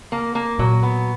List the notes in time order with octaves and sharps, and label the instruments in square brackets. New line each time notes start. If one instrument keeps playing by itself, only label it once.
[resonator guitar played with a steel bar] A#3
A#3
[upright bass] A#2 [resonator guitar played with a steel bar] F#3
[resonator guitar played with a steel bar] B3